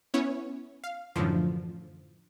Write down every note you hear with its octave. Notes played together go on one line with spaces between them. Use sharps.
B3 C#4 E4 C#5
F5
F#2 A2 D3 E3 F3